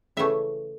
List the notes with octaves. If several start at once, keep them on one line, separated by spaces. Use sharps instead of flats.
C#3 E3 A3 C#4 E5